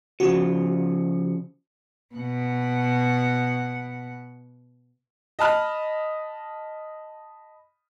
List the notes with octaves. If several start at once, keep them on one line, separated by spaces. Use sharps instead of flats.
C#3 F3 F#4
B2 F#5
D#5 A5 B5 F6